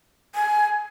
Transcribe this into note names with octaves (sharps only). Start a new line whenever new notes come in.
G#5